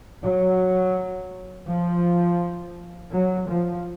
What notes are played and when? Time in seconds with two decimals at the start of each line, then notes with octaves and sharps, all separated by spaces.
0.23 F#3
1.67 F3
3.11 F#3
3.48 F3